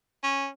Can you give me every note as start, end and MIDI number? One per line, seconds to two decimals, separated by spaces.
0.23 0.48 61